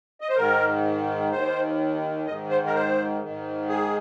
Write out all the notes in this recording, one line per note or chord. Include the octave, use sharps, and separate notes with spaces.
D#5
C5
G#2 D#3 A#4
D#2 D#3 C5
G#2 D#3 D#5
C5
A#4
C5
G#2 D#3
G#4